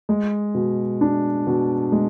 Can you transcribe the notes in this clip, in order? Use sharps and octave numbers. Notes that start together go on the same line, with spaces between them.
G#3
B2
D4
B2
G#3